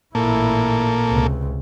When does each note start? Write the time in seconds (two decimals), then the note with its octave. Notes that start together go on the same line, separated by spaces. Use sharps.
0.15 A1 A#2 A#3 E4 A4
1.06 C#2 C3